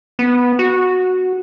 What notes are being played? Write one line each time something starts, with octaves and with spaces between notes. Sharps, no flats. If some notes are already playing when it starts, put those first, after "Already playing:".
B3
F#4